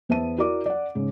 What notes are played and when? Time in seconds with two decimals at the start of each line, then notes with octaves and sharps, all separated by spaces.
0.09 E2 B3 C5 E5 A5 D#7
0.38 E4 F#4 A#4 D5 D6
0.66 D5 F#5
0.95 G#2 C#3